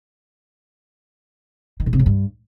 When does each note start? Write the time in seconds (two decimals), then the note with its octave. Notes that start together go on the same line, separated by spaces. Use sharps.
1.80 D#3
1.86 A#2
1.93 C3
1.99 A2
2.06 G2